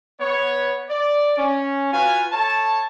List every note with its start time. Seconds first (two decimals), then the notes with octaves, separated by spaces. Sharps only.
0.20 B3 C#5
0.90 D5
1.37 C#4
1.92 F4 F#4 B4 F5 G#5
2.32 A4 C#5 A5